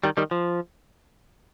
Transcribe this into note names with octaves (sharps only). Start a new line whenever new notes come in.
D#3 G3
D#3 G3
F3